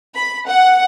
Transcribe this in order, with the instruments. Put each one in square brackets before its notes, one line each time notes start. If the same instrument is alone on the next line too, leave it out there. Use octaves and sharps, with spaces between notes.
[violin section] B5
F#5